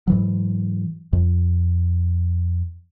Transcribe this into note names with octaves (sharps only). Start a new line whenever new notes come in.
G#2 E3 F#3
F2